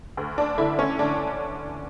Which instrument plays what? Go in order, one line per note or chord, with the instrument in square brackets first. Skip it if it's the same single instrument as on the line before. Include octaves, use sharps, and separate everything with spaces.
[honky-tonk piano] D2
D4
D3 E4
C#4
D3 D4